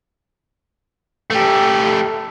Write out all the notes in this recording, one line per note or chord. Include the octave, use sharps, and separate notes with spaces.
A3 G4